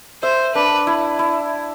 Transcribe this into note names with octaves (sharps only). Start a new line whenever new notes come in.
C5 E5
D4 B4
E4
E4